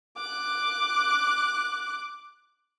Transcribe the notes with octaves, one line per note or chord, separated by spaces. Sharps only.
D6 F#6